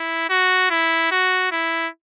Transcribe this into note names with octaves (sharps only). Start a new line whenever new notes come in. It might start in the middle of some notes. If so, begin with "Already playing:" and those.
Already playing: E4
F#4
E4
F#4
E4